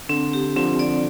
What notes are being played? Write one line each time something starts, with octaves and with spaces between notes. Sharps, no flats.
D3 C4
G4
D3 F3 C4
D5